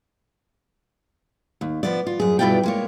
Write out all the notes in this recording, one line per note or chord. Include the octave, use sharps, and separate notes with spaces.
D#2
F3 B3 D5
F4
F#2 G#4
G2 B2 E4 F4 D5 G5
G#3 A#3 C#5